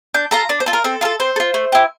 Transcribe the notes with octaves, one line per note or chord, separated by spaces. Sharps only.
D4 G6
F4 A4 A#5
D4 D5
C5
F4 A4
A#4
C4 A4
F4 A4 A#4
C4 C5
A4
F4
A3
E4 G4